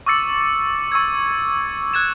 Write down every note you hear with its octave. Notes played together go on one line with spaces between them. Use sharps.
C#6 D6 E6 A6 C#7
C#6 E6 G#6
F#6 G#6 E7